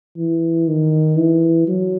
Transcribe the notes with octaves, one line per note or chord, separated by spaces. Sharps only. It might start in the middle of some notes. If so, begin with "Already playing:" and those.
E3
D#3
E3
F#3